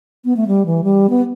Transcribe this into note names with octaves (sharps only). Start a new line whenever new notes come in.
B3
A3
G3
E3
G3
B3